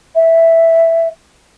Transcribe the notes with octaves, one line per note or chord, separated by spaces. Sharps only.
E5